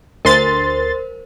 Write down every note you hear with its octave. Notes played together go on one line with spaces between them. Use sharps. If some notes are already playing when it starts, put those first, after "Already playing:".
D2 A#4 C5 C6 A6